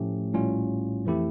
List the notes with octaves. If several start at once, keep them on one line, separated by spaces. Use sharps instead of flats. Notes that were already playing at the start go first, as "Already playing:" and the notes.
Already playing: A2 F3 A3 C#4 G4
A#1 A2 G3 C#4 F4
F2 E3 A3 E4 G4